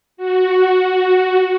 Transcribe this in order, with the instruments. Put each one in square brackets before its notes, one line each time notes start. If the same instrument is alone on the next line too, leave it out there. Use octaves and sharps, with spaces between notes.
[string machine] F#4